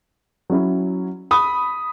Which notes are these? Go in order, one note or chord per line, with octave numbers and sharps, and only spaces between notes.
F#3 C#4 E4
B5 D#6